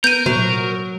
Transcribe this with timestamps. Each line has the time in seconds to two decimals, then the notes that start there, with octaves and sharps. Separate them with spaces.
0.04 B3 A#4 G6 D#7
0.26 A#2 F#3